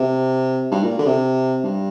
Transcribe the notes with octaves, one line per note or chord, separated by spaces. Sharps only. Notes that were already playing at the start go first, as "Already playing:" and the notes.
Already playing: C3
G2
A#2
D3
C3
G2